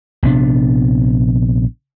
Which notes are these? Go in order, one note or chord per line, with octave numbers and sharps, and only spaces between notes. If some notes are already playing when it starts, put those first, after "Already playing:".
A#1 C3 B3 D4